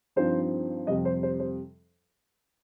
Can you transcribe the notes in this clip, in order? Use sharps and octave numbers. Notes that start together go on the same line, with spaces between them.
G2 F3 C4 D#4 C5
F2 C3 G3 D#5
C5
C5
C5